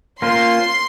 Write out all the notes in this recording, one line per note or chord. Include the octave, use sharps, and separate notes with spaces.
A#3 C#4 F4 C5 C6